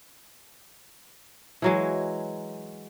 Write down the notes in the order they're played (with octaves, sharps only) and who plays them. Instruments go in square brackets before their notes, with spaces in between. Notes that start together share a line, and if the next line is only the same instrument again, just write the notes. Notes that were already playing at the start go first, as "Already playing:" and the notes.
[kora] E3 F#3 G#3